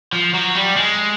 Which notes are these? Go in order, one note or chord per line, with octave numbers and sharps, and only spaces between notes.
F3
F#3
G3
G#3